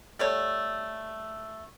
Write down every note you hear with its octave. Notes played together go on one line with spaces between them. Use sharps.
G3 A3 C#5